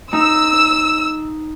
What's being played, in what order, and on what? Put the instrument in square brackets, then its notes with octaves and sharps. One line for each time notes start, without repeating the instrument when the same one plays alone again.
[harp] D#4 [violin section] E6